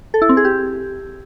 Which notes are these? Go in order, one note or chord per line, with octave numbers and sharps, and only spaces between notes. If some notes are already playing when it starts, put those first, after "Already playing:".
A4
E4
C4
G#4
G4